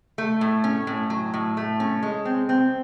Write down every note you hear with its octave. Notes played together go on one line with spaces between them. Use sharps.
A3
A2
C#4
A2
F#3
A2
A3
C#4
G#3
C4
C4